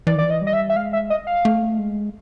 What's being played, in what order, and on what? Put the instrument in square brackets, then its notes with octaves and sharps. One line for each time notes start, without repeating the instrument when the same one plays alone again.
[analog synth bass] E3 [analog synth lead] D5
[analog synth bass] D#3
[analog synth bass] E3 [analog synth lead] D5
[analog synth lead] D#5
[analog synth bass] G3
[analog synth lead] D#5
E5
E5
[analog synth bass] G#3 [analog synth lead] F5
[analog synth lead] E5
D#5
F5
[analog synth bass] A3
G#3